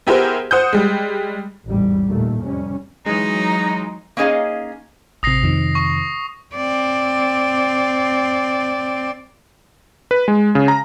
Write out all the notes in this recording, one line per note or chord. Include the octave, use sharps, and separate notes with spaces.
B3 E4 G4 G#4 A#4 C5
C5 F#5 D#6 G6
G3 G#3
A1 E2 G#2 G3
D#2 A#2 A3
F2 C3 G3 C#4
E3 F#3 G#3 D#4 A#5
A#3 C#4 D#4 G#4 D#5 F5
A1 C3 D#6 A#6 C7
F2 C3 D#3
C#6
C4 D5
B4
G#3
C#3
A#5